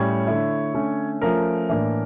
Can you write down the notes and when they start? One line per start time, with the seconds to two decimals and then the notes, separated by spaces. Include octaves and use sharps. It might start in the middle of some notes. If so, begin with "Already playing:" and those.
Already playing: A2 G3 C#4 C#5
0.27 D3 A3 E4
0.74 D3 A3 C#4
1.22 F3 A3 C#4 A#4
1.69 A2 E3 A#3 D4